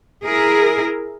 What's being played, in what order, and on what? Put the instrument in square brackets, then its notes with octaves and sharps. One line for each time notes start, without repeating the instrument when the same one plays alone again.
[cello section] E4 G#4 A#4